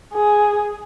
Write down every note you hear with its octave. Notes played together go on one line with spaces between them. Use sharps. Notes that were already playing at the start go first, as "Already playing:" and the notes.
G#4